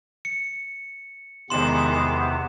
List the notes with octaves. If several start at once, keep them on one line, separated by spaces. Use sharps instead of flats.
C#7
E2 C3 D#3 G#3 B3 C6 E7